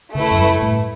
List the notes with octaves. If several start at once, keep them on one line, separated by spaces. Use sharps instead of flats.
C#3 A3 E4 B4
F#2
G2
A2